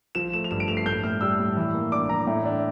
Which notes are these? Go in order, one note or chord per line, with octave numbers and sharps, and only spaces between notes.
F3 E7
A3 E7
F7
G2 E7
D7
A3 F7
C7
A2 G6
A2 F6
G3 E6
A2
E3
A#3
D4 D6
E3 A#5
A2
D4